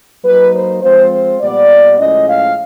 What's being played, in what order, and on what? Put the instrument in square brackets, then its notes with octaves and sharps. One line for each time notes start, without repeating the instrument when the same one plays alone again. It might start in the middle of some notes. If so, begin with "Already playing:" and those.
[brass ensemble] F#3 A#3 D#4 B4
C5
F3 G#3 C4 F4 C5
C5
A#2 G3 B3 D5
A2 F3 G#3 C#4 D#5
F5